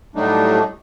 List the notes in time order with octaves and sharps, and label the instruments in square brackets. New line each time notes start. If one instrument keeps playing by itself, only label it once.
[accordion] A2 F#3 G3 A3 D4 D#4